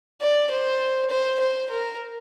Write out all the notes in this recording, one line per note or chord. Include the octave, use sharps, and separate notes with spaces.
D5
C5
C5
C5
A#4